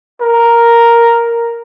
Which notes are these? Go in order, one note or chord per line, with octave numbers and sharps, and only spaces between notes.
A#4